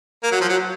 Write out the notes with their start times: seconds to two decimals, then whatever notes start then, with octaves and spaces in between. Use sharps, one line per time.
0.23 A#3
0.32 F#3
0.41 F3
0.49 F#3